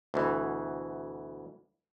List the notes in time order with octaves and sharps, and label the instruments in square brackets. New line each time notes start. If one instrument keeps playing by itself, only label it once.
[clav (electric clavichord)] D2 B2 E3